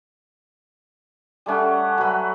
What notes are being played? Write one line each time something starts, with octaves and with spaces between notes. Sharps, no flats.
G3 A3 C#4 F#5
F#3 B4